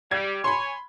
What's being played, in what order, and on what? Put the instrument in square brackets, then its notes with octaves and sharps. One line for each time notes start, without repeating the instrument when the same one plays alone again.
[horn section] G3 [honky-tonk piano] G#6
[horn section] C#5 G#5 [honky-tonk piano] B5 C6